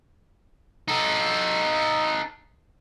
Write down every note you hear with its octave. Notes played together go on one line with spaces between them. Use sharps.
D#4 A4